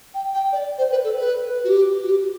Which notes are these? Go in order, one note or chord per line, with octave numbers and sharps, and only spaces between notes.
G5
G5
D5
C5
B4
A4
B4
F#4
G4
F#4
G4